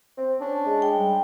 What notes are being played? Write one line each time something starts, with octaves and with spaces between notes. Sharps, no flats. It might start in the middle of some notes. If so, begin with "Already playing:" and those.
C4
C#4 D4
G#3
G5
G3